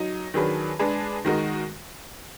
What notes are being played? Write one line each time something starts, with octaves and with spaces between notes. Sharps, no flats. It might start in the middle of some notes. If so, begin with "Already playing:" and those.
Already playing: F#3 D#4
D#3 F#3 D4 G#4 B4
G#3 D4 G#4 B4
D#3 G#3 D#4 F#4 A#4